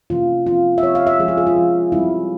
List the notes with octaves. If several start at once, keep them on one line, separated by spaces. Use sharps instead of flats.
C3 E3 A#3 C#4 F4
F3 C4 F4
E5
F3 C4 C#5
F5
E5
F3 G#3 C#4 G#4
F4
G#4
F4
F3 G#3 C#4
E3 G3 C4 E4